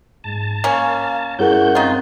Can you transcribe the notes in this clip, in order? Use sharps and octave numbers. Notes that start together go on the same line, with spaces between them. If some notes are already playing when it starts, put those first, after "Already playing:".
G#2 A5
A#3 C#4 F5
G2 C#4 E4 G#4 A#4 F#5 G6
D#3 C4 F4